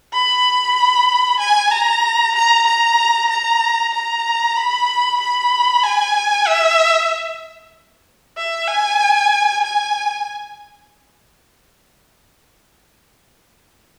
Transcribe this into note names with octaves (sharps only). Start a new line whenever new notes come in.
B5
G#5
A#5
A#5
A#5
A#5
A#5
B5
B5
G#5
E5
E5
G#5
G#5